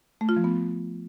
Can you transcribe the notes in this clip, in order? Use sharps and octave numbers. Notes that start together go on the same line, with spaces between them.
A3
F4
F3
B3